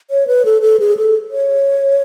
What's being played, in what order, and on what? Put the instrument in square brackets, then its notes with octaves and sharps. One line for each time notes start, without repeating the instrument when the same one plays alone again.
[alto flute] C#5
B4
A4
A4
G#4
A4
C#5